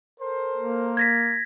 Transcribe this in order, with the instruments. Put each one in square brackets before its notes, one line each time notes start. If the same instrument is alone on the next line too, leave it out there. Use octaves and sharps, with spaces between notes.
[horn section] A4 A#4 C5
[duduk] A#3
[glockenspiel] G#6 A#6 B6